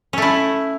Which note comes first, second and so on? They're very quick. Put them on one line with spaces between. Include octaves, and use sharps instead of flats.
C#4 A3 E4